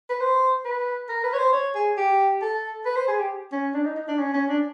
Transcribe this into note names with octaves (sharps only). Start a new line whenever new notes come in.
B4
C5
B4
A#4
B4
C#5
C5
C#5
G#4
G4
A4
B4
C5
G#4
G4
C#4
D4
D#4
D#4
D4
C#4
C#4
D4